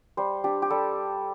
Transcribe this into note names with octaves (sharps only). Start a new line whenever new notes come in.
G3 C5
D4 G4
G4
G3 A4